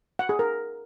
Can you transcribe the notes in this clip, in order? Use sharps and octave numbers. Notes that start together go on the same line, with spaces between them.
F#5
G#4
A#4